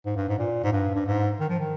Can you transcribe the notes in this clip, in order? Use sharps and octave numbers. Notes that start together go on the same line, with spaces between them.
G#2
G2
G#2
A#2
G#2
G2
G2
G#2
D#3
F3
D#3